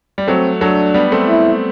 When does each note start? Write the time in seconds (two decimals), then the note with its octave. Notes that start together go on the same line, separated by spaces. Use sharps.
0.18 G3
0.28 F#3 A3 C4
0.61 F#3 A3 D4
0.94 G3 B3
1.12 A3 C4
1.29 E4